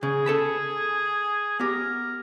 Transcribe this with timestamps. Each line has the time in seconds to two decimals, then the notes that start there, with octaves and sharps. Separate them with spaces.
0.03 C#3 G#4
0.26 A4 A5 B5
1.60 B3 G4 A#4